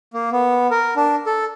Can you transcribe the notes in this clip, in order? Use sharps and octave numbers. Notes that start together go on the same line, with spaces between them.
A#3
B3
A#4
D4
A4